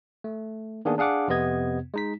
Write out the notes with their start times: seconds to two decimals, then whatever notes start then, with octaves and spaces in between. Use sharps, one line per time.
0.24 A3
0.85 D#3 A#3 B3 D4 G#4
0.98 D4 G#4 F5 F#5 D6
1.28 F2 C3 B3 D#5 G#6
1.94 G#3 D#4 B6